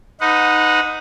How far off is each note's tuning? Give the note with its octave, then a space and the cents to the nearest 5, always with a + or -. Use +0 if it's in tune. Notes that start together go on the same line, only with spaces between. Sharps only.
D#4 +0 B4 +20 F#5 -20